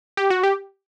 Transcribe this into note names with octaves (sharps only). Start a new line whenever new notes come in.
G4
F#4
G4